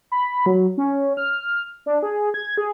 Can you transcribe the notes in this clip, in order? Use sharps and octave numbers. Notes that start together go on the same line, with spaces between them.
B5
F#3
C#4
F6
D4
G#4
G#6
G#4